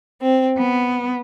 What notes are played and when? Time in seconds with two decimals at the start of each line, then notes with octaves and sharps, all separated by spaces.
0.21 C4
0.56 B3